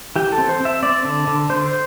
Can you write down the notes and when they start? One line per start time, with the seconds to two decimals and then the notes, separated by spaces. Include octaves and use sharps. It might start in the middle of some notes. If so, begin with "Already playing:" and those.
0.16 E3 G4
0.32 A4
0.38 C4
0.49 C5
0.61 C4 E5
0.83 C4 D5
1.05 D3
1.27 D3
1.49 D3 C5